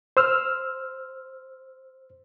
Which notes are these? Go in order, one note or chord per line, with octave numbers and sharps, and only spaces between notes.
C5 E6 F6